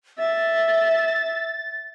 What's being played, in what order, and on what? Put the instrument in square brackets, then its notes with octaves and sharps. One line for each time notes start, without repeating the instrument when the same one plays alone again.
[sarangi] E5 [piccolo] A6